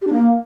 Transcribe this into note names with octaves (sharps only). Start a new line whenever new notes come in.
G4
D4
A#3